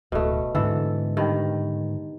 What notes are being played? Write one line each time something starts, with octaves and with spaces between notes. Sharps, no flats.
D1 B2 A3
G#2 D3 E3 A4
G2 D#3